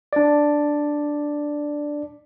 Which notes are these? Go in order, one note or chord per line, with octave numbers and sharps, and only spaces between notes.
D4 D5